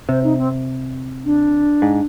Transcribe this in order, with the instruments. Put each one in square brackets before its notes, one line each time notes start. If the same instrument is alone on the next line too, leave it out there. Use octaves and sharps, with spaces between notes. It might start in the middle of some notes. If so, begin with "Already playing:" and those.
[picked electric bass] C3 [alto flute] C5
[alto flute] D#4
C4
D4
[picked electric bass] G#2